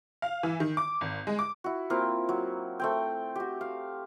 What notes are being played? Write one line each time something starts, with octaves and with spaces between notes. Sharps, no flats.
F5
E3
D#3
D6
G#1
G#3
D6
E4 F#4
A#3 C4 E4 F4
F#3
A3 C4 G5
F#4 G4
F5